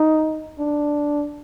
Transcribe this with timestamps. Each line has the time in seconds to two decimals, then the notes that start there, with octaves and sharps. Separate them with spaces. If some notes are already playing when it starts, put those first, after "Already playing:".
Already playing: D#4
0.59 D4